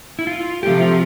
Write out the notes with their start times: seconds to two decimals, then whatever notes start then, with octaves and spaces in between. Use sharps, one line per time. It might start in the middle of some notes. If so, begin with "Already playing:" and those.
0.19 E4
0.27 F4
0.63 C3 F3 A3 G4
0.81 F4